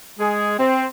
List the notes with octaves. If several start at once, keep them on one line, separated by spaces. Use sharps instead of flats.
G#3 G#4
C4